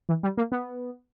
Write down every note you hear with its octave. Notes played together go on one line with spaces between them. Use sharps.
E3
G3
A#3
B3